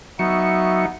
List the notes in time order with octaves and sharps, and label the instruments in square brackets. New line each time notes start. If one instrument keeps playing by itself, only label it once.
[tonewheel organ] F#3 E5 C#6 [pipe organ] B3 D#4